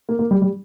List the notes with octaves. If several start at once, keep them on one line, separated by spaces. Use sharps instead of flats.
A#3
A#3
G3
G3